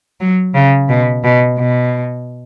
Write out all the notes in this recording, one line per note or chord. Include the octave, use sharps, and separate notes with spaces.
F#3
C#3
B2
B2
B2